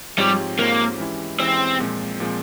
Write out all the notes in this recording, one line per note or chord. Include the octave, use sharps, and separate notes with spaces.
G#2 F3 G3 C4 G4 C#5
G#2 F3 A#3 C4 G4 C#5
E3 G#3 C#4 E4 G4
E3 G#3 C4 C#4 E4 G4
A#2 F3 G#3 C4
A#2 F3 G#3 C4